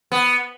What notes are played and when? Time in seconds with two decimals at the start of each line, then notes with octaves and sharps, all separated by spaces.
0.12 B3